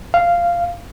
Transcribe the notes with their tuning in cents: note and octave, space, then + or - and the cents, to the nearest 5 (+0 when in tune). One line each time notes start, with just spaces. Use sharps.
F5 -10